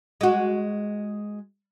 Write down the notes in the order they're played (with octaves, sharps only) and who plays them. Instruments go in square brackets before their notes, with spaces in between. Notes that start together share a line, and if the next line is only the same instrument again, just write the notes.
[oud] G#3 F#4